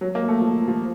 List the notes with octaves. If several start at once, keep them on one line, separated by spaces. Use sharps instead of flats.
F#3
A#3
A3
F3
F3